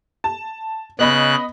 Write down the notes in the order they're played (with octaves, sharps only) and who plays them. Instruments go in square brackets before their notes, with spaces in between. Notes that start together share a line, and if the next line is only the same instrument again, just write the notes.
[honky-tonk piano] A5
[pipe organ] C#3 F#6 [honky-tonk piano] B3 D#5 B5